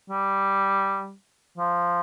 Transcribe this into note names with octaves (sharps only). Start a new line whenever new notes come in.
G3
F3